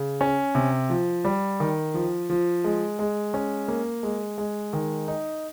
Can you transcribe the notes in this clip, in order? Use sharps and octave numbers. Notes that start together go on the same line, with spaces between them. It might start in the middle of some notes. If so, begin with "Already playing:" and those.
Already playing: C#3
C#4
C3
F3
G3
D#3
F3
F3
G#3
G#3
C#4
A#3
G#3
G#3
D#3
D#4